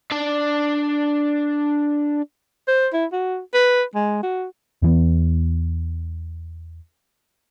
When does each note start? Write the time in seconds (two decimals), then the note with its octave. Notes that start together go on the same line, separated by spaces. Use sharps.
0.11 D4 D5
2.68 C5
2.94 E4
3.12 F#4
3.54 B4
3.95 G#3
4.23 F#4
4.82 E2 E3 B3